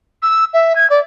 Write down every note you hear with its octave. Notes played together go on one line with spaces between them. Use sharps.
E6
E5
G#6
D5